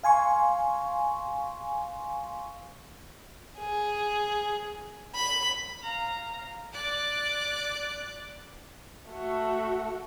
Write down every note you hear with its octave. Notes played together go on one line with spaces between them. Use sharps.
F5 G#5 C6 C#6
G#4
B5
F5 A#5
D5 F#6
A3 F#4